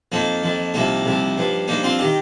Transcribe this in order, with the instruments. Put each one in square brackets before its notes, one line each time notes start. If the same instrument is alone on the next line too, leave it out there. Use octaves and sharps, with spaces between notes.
[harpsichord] F2 F3 A#3 D#4
F2 F3
C2 C3 F3 A#3 D#4
C2 C3 F3
G2 F3
G2 F3 A#3 D#4
C4 F4
D#3 D#4 G4